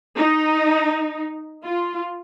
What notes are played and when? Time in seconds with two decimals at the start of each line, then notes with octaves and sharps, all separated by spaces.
0.16 D#4
1.63 F4